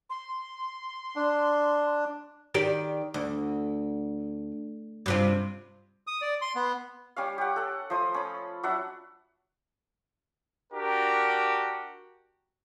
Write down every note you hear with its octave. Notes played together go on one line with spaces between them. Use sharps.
C6
D4
D#3 G4 D5
D2
G2 C3 F4
D#6
D5
C6
B3
G3 C#4 F5
G4 F#5
A4 F#5
F3 A3 C5 D#6
C#4 B5
F#3 D4 E5 F#5
D4 F#4 G4 A#4